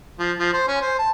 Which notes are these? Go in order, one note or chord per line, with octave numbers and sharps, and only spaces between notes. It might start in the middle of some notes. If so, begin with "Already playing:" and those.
F3
F3
C5
C#4
C5
A5